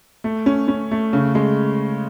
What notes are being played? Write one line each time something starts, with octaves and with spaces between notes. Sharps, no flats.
A3
C#4
C#4
A3
C#3
G#3